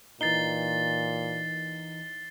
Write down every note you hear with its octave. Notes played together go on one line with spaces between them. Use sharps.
A#2 E3 D#4 A6 C7 G7